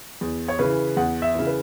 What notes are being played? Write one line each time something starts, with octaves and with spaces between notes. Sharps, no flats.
E2
C#5
C#3 E3 B4
E2 F#5
E5
C#3 E3
B4